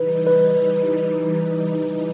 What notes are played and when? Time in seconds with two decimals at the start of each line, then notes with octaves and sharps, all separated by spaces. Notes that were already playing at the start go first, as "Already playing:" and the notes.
Already playing: E3 G3 D#4 B4
0.27 B4